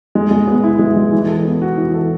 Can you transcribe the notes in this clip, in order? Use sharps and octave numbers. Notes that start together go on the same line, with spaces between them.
G#3
G#3
B3
E4
G#3
G#3
E3
A4
B3
F#4
E3
A4